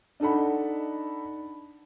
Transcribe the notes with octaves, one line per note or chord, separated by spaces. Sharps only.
D4 D#4 A4 F#5 B5